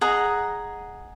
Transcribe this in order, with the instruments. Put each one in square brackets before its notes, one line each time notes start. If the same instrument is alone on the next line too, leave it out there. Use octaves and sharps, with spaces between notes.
[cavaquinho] G#4 D#5 F#5 A#5